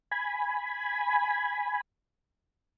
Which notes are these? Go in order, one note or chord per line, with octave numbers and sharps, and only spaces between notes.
G#5 B5